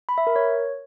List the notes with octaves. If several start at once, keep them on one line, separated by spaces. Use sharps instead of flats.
B5
E5
A#4
C#5